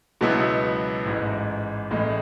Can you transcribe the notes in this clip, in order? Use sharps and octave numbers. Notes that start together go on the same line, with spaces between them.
C#2 B2 F#3 B3 E4
A1 G#2 E3
A1 A2 G#3